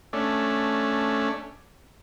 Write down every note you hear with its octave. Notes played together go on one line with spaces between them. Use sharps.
A3 C#4 D4